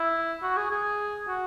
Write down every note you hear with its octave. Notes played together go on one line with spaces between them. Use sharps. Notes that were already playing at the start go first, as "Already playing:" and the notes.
Already playing: E4
F#4
G#4
G#4
F#4